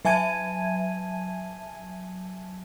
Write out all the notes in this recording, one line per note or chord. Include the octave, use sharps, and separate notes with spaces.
F#3 E5 G#5 A5 G#6 D#7